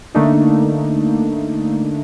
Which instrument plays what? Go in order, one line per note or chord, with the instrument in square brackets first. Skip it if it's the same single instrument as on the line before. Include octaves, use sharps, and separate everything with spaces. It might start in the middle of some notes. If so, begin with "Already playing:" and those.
[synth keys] D3 A3 A#3 D4 D#4